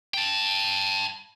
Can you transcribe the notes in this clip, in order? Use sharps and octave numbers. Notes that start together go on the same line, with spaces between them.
G5 A5